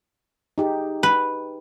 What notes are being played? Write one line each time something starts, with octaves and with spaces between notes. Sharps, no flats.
D#4 G4 G#4
B4